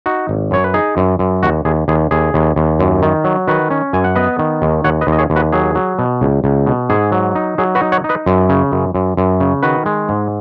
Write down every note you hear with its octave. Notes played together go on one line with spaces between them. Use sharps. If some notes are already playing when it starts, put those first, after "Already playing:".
D#4 F#4
G#1
F#2 C#5
B4
D#4 G#4
F#2
F#2
D#2 F#4
D#2 G#4
D#2 G#4
D#2 G#4
D#2
D#2
F#2
D#3
F#3
D#3 F#4 B4
C#4
F#2 G#5
F#5
B3 B4 D#5
D#3
D#2
D#2 C#5 F#5
B4 D#5
D#2
D#5
G#4 C#5
D#2
F#4 B4
F#3 G#4
F#3
B2
C#2
C#2
B2
G#2 G#4
F#3
D#4
F#3 G#4
F#4 B4
D#4
C#5 F#5
D#4
B4 D#5
F#2
C#3
F#2
F#2
F#2
C#3
D#3 F#4 B4
G#3
G#2